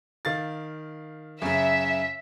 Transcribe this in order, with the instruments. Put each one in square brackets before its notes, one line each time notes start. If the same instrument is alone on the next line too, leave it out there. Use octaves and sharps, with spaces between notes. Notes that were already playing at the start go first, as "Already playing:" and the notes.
[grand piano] D#3 F5 A6
[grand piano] F#2 C#3 [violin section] E5